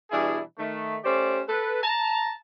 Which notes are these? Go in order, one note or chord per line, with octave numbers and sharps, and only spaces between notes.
B2 E3 G3 D4 E4 G#4
D#3 A3
A3 C#4 G4 C5 D5
A4 B4
A5 A#5